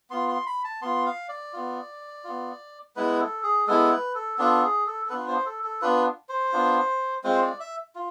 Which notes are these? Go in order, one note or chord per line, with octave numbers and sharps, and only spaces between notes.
B3 F4 C6
C6
B5
A5
B3 F4 C6
F5
D5
B3 F4
B3 F4
G#3 B3 E4 B4
A4
G#4
G#3 B3 E4 A4
B4
A4
B3 D4 F4 A4
G#4
A4
A4
B3 D4 F4 B4
C5
A4
A4
B3 D4 F4 B4
C5
B3 D4 F4
G#3 C4 F4 C5
D5
E5
F4